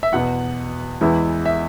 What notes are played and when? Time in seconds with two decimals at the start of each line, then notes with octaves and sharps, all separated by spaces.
0.03 E5
0.12 E2 B2 B3 F#5
1.01 E2 E3 G#3 B3 E4
1.46 E5